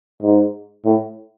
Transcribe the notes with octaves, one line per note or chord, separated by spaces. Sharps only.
G#2
A2